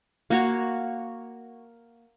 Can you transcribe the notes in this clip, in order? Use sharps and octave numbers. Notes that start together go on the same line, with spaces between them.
A#3 F#4 C#5